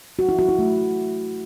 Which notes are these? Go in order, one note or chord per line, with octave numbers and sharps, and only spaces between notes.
F#4
E4
F#4
E4
A3